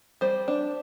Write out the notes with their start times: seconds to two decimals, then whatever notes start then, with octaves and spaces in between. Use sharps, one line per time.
0.21 G3 C5
0.48 D4